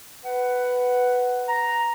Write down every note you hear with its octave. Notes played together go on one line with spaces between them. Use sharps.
B4 F#5
A#5